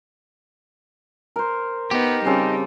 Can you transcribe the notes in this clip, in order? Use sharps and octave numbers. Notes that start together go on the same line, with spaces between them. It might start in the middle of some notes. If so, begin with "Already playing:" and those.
A#4 C5
B3 D#4 G4
C#3 G3 C4 A5